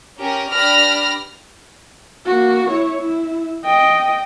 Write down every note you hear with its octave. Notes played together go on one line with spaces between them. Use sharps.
C#4 G4 A#4
D4 G4 B4 B5 F6 A#6
A#3 F#4
E4 C#5
E4
D#5 G5